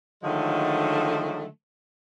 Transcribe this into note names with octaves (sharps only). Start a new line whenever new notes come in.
D3 D#3 F3 F#3 G#3 A3